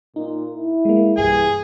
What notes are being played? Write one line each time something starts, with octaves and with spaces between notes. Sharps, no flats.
A#2 D#4
E4
G#3 A#3
B1 G2 E3 G4 G#4 G#5